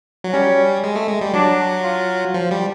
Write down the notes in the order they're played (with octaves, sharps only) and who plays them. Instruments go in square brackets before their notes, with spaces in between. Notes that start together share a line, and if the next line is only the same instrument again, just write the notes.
[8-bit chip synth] F#3
[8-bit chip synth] G3 [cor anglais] C#4
[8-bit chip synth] G#3
A3
G#3
G3
[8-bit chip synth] F#3 [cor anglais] D4
[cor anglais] F4
[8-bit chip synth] F3
G3